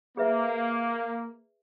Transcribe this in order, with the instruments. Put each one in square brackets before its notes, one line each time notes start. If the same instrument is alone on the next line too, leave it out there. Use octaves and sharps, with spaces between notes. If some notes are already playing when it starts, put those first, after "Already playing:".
[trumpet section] A#3 [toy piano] G#4 B4 E5